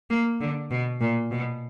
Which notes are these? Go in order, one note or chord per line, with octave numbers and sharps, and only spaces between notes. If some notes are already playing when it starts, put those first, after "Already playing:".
A#3
D3
B2
A#2
B2